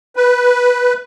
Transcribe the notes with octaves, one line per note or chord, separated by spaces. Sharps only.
B4